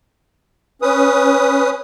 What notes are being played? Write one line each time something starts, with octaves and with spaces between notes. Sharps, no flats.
C#4 B4 D#6